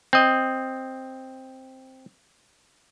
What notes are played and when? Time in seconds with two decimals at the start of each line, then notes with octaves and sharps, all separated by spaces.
0.13 C4 D#5